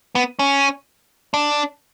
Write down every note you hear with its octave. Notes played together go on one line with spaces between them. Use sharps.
B3
C#4
D4